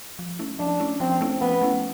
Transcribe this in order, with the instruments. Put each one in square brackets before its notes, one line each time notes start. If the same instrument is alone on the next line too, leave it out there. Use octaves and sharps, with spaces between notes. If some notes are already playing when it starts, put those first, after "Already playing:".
[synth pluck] F3
A3 C#4 E4
[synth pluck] F3 [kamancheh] D4
[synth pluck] A3 C#4 E4
[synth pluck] F3 [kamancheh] C4
[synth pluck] A3 C#4 E4
[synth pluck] F3 [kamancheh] B3
[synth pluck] A3 C#4 E4